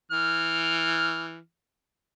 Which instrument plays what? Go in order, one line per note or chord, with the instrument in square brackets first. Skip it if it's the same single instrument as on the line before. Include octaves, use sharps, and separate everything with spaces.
[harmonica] E3 F6